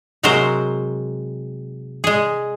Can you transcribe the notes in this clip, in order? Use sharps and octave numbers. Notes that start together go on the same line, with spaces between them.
C3 F#3 G#3 A#4 C5
G#3 G#4